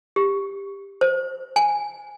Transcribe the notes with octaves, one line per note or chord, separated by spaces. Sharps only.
G4
C5
G#5